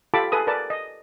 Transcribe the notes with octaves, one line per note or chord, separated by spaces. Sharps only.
F4 G4 A4 A5 B5 D6
G#4 A4 B4 D#6
A#4 B4 D5 A5
D#5